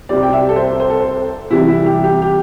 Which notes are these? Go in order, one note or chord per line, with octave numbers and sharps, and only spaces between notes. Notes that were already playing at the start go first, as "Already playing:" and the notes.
C2 C3 G3 C4 D5
G5
E5
G4
A4
C5
C5
A4
C5
C2 C3 E3 G3 E4
E4
G4
G4
G4